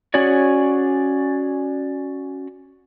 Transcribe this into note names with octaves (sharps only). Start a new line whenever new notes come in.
C#4 F#4 G#4 C#5 D5